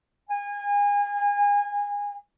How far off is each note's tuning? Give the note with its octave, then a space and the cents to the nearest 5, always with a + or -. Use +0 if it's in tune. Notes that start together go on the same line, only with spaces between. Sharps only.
G#5 -30